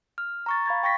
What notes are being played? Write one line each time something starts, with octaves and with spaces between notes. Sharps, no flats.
F6
A#5 C#6 A6
F5 B5 G#6 A6
G5 C#6 A#6 B6